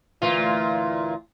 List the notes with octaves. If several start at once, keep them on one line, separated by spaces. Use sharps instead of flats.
D2 A#2 E3 F4